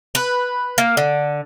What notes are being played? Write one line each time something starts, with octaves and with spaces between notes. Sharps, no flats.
B4
A#3
D3